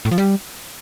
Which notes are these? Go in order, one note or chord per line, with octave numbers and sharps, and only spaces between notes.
A2
F3
G3